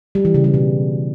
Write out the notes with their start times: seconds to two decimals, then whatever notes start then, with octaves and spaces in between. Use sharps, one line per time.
0.15 G3
0.25 E3
0.34 C#3
0.44 G3
0.54 B2